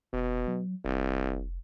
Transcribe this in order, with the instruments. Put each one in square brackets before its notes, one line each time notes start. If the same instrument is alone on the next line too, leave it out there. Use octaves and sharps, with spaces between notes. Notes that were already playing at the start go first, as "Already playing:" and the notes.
[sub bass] F1 [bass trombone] B2
[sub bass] F#3
[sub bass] F1 [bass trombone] C2